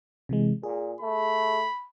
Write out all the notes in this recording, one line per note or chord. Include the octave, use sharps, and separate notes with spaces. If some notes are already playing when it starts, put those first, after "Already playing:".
C3 E3 G#3
A#2 G#4
A3 B5